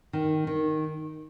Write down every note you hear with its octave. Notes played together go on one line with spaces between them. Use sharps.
D#3
D#3